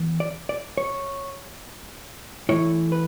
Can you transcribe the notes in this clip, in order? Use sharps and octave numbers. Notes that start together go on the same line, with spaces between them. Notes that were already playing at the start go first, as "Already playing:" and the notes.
Already playing: E3 B3
D5
D5
C#5
E3 A3 E4 C#5
B4